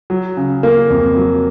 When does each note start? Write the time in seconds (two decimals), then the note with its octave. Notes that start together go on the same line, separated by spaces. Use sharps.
0.10 F#3
0.37 C#3
0.63 A#3
0.90 F2
1.17 F#3